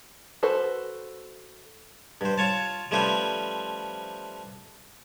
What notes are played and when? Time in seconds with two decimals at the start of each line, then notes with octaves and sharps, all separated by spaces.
0.43 F#4 A4 B4 C5
2.21 G2 C5
2.38 F4 C#5 A5
2.91 F3 G3 A3 C#4 B4 C5